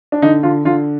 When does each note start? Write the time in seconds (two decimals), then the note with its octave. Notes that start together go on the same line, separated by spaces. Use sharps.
0.12 D4
0.22 D3 D#4
0.43 D3 F4
0.65 D3 F4